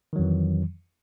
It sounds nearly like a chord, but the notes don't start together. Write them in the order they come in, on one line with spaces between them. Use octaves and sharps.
D#3 F#3 F2 E3